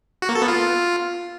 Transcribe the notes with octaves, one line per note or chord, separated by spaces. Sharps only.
F#4
A#3
A4
B3
F4